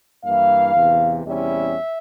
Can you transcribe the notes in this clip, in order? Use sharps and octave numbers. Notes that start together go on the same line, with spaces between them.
G2 E3 A#3 E4 F5
E2 C3 E3
E2 C3 G3 C#4 E4 E5